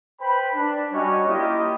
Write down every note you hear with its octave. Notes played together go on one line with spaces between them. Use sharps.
B4 C5 G5 B5
D4
G3 C#4 F#4 C#5 D#5 C#6
A#3 E4 F4 G4 D#5